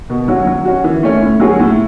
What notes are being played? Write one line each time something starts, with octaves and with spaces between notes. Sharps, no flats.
B2
F#3 C#4 F#4
F#3
C#4 F#4
E3
A3 C#4
A2
F#3 C#4 G#4
A2